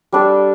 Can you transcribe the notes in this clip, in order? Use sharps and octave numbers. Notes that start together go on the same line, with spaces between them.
G3 D4 A4